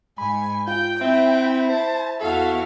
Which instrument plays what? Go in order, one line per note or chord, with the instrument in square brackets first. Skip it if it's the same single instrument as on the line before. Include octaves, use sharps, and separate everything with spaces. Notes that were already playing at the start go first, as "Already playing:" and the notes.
[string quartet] G#2 [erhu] G#5 [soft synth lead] B5
[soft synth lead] F4 [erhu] G5 [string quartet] G6
[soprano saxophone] C4 [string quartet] E4 [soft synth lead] E5
[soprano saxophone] C5 [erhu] A5
[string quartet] E2 E4 F#4 [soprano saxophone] A4 [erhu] F5